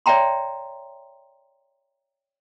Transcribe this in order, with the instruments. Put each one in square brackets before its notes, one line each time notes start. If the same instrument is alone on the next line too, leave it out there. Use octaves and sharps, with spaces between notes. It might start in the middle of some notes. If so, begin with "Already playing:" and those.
[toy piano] C#5 D5 E5 G5 A#5 C6